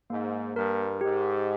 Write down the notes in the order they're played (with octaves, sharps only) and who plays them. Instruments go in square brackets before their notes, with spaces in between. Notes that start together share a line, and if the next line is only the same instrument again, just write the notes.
[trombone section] G#2 [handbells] A#3
[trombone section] G2 [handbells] A#4
[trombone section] G#2 [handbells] G4